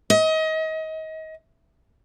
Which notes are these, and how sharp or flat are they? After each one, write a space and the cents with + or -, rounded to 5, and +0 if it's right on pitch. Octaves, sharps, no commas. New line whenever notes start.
D#5 +30